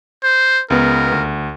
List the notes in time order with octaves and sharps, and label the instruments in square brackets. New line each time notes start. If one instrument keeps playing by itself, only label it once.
[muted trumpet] C5
[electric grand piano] C#2 B3 [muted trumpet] A#4
[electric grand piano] D2